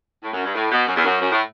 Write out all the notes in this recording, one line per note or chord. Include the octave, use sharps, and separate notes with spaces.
A2
F#2
G2
A2
B2
F#2
E2
F#2
F#2
A2